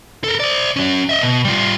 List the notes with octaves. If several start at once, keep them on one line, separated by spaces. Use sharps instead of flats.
A4 A#4
C5 D5
C#4 F#4
D#5 E5
B2
G3 F4